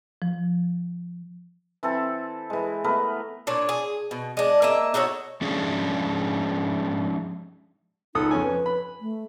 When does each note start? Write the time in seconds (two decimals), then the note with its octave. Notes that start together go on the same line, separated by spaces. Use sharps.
0.22 F3
1.83 E3 C4 A4 E5
2.50 E3 G#3
2.84 A3 B3 A#4 B4
3.47 A#2 D4 C#5
3.69 G#4
4.11 B2
4.37 G#3 D4
4.62 A#3 D#5 E5
4.94 D#4 F#4 A4 C#5
5.41 F3 G#3 C#4 D4 G#4
8.15 C#2 D#4 A4 D#6
8.31 F2 C#4 G#5
8.43 B4
8.66 B5
9.01 A3